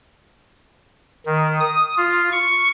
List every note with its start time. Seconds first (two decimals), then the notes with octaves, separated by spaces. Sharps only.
1.26 D#3
1.61 D#6
1.97 F4
2.32 C#6